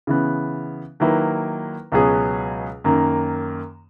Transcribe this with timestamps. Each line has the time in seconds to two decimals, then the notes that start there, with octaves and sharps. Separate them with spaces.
0.07 C#3 E3 B3
1.00 D#3 F#3 A#3 E4 B4
1.92 C#2 B2 F#3 C#4 G#4
2.84 F#2 D#3 A#3